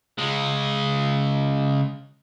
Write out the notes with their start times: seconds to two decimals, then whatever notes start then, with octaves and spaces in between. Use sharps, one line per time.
0.19 C#3 G#3